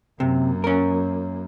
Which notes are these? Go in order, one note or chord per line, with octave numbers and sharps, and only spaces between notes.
F#2 C3 A#3
C#4 A#4